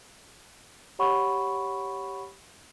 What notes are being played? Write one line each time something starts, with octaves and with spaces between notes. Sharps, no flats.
G4 C#5 F#5 B5 C#6